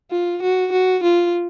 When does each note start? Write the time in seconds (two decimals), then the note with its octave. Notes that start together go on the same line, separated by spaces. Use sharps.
0.11 F4
0.42 F#4
0.72 F#4
1.03 F4